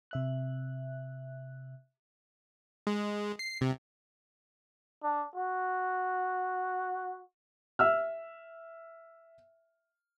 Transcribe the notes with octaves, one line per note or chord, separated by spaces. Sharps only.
C3 E5 F#6
G#3
C7
C3
D4
F#4
E5 E6 F6